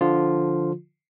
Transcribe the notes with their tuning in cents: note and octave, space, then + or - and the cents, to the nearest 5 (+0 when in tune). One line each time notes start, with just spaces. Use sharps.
D3 +0 F3 +0 F4 +0